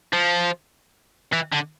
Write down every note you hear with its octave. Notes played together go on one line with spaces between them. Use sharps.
F3
E3
D3